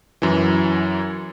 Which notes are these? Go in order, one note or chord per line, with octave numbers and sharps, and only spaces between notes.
F#2 E3